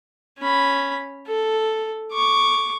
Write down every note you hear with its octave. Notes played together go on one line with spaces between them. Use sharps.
C#4 B5
A4
C#6 D6